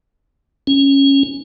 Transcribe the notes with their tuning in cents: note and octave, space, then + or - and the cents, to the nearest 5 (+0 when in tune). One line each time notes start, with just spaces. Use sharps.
C#4 -10